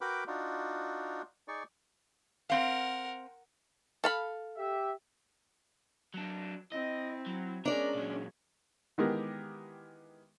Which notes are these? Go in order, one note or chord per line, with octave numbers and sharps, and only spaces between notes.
F#4 A#4 B4 G5 B5 D6
D4 D#4 F4 F#4
D#4 G#4 D5 C#6
C4 A#4 F5 F#5
A4 F5 B5
G4 E5
F#3 D4
C4 E4 D#5
F#3
G#3 C#4 D4 A#4 D5
A#2 F#3
D#3 E3 G#3 B3 G4 A#4